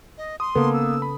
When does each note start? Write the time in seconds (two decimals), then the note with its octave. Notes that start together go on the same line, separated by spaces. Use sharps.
0.18 D#5
0.40 C6 D#6
0.55 C#3 A#3 B3 A4 B4
0.73 E6
1.02 B5